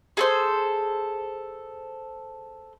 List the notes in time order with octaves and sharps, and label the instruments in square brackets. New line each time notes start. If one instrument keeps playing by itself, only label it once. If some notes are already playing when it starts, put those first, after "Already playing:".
[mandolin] G#4 A4 C5